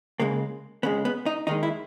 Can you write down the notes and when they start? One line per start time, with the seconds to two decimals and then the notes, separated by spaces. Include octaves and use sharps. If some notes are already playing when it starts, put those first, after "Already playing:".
0.20 C#2 C#3 G#3 A#3
0.83 C#2 C#3 G#3 B3
1.05 B3
1.26 D#4
1.47 D#2 D#3 G#3 D#4
1.63 E4